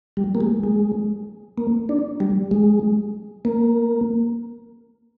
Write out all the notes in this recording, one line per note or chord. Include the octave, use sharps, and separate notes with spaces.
G3
A#3
G#3
G#3
A#3
D4
G3
G#3
A#3